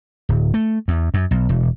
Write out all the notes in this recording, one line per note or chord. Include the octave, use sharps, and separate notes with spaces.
D1
A3
E2
F#2
B1
E1